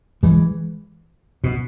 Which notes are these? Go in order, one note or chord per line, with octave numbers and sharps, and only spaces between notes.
E3 G#3
B2